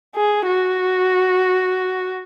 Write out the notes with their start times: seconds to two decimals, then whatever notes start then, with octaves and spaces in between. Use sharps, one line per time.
0.16 G#4
0.47 F#4